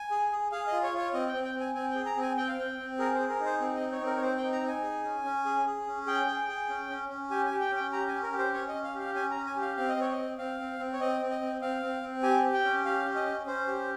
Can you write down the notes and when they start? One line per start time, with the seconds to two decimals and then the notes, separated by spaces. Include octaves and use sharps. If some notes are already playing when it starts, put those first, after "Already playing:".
Already playing: G#5
0.11 G#4
0.32 G#4
0.52 G#4 F5
0.67 D#5
0.72 F4
0.83 C#5
0.94 F4 C#5
1.14 C4 D#5
1.29 G5
1.34 C4
1.45 G5
1.55 C4
1.60 G#5
1.75 C4 G#5
1.91 G#4 G5
2.06 A#5
2.16 C4
2.22 G#5
2.37 C4 G5
2.48 F5
2.58 C4 G5
2.78 C4
2.99 G#4 A#4
3.14 C5
3.19 G#4
3.29 A#4
3.40 D#4
3.45 C5
3.60 C4
3.75 D#5
3.81 D#4
3.92 C#5
4.01 C4
4.06 A#4
4.16 C#5
4.22 C4 C5
4.38 G5
4.43 D#4
4.53 A#5
4.63 D#4 G#5
4.83 G#4
5.04 C#4
5.25 C#4
5.45 G#4
5.66 G#4
5.87 C#4
6.06 G#4 G5
6.27 G#4
6.48 G#4
6.69 C#4
6.90 C#4
7.09 C#4
7.30 G4 G#5
7.46 G#5
7.51 G4
7.60 G5
7.71 C#4 G5
7.92 G4 A#5
8.08 C#4 G#5
8.23 A#4
8.32 G4
8.39 C5
8.53 C#4 C#5
8.68 D#5
8.74 C#4
8.84 F5
8.95 G4 F5
9.15 C#4 G#5
9.31 C#4 A#5
9.46 G#5
9.56 G4
9.61 F5
9.77 C4 F5
9.89 D#5
9.97 C4 C#5
10.12 D#5
10.18 C4
10.38 C4 F5
10.59 C4
10.79 C4
10.93 C#5
11.00 C4 D#5
11.21 C4
11.30 D#5
11.41 C4
11.61 C4 F5
11.83 C4
12.02 C4
12.23 G4 G#5
12.44 G4
12.54 G5
12.64 C#4
12.85 G4 F5
13.05 C#4
13.15 D#5
13.26 C#4
13.46 C#4 C5
13.67 G4